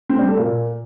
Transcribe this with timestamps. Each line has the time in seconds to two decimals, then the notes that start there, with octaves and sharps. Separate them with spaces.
0.09 C4
0.19 G3
0.28 A3
0.37 A#2